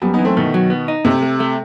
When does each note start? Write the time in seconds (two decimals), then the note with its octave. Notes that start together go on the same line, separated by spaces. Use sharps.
0.02 F#2 G3 B3
0.13 B3 D#4
0.19 E3
0.25 A3 C4
0.36 B2 D#3 A3
0.54 F#3
0.70 B3
0.88 D#4
1.05 C3 A3
1.22 A3
1.40 A3